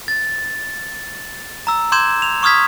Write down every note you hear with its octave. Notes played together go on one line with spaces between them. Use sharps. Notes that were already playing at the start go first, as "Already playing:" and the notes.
A6
A#5 E6
C6 D6 G6 G#6 E7
F7
C#6 D#6 F6 G#6 B6